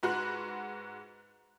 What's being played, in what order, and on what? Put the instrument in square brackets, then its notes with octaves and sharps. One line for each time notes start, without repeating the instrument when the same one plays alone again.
[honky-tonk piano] G#2 F#4 B4 C6 F#6